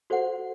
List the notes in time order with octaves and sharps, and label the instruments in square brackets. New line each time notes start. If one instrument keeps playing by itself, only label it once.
[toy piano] F#4 C5 F#5 [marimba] A4